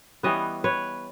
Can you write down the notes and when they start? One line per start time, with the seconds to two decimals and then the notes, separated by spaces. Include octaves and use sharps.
0.23 E3 G3 B3 C#5 D#5
0.64 B4 C#5